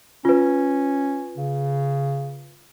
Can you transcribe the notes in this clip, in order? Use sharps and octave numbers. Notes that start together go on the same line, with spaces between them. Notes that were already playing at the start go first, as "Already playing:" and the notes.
C#4 F4 B4
C#3